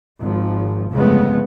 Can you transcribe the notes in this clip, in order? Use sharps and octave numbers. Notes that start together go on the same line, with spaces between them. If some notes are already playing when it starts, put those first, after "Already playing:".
G#1 F3
G1 F2 C#3 G#3 A3 B3